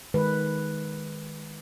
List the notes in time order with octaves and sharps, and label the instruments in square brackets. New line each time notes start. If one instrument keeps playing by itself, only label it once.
[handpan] D#3 G#3 B4